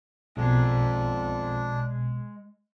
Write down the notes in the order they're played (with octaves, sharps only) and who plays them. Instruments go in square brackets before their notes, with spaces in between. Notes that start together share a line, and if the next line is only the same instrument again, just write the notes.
[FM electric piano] B1 B2 [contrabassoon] F2 [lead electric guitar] G#3 A#5 [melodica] D4